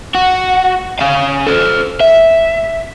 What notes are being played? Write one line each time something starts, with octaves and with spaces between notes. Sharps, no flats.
F#4
C#4 F5
A4 C5
E5